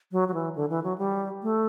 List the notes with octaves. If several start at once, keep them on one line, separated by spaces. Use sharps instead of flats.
F#3
F#3
E3
D3
E3
F#3
G3
A3